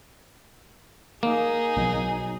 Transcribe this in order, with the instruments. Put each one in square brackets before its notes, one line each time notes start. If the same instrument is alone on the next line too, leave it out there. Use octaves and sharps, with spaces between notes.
[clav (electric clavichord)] A#3 [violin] D#4 G#4
[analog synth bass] B1 [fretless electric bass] B2 F#3